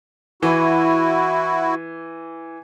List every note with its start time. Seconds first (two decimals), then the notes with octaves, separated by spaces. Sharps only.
0.43 E3 E4 F#4